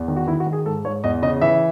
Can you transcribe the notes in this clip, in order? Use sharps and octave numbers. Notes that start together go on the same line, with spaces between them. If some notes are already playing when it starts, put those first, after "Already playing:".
Already playing: E2
D#3
F#4
D#3 E4
F#4
D#3
G#4
G#2 A4
G#2 C#5
E2 D#5
C#3 D#5
E3 E5